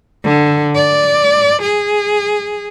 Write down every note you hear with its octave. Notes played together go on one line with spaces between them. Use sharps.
D3
D5
G#4